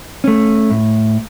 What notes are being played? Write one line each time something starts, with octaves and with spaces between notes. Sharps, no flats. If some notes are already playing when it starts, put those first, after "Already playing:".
A3 C#4
A2